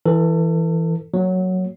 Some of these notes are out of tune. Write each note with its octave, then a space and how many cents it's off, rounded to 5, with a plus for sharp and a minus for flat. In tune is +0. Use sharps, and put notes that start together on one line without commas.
E3 +0 A4 +25
F#3 +0 A#3 -35